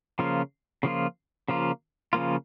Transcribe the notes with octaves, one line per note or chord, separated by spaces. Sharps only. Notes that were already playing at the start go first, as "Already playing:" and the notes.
C#3 F3 A#3 F4
C#3 F3 A#3 F4
C#3 F3 A#3 F4
C#3 F3 A#3 F4